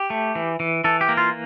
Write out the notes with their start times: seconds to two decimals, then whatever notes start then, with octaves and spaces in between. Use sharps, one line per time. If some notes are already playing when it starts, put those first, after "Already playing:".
Already playing: G4
0.10 A3
0.35 E3
0.60 E3
0.84 E3 A4
1.01 G4
1.09 A#3
1.17 F4